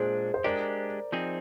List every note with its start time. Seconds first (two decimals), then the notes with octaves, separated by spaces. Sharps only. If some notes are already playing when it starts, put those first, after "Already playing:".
Already playing: A#2 G#3 D4 G#4 C5
0.34 C5
0.44 G#3 D4 G4 A#4 D5
1.12 F3 C4 D#4 G#4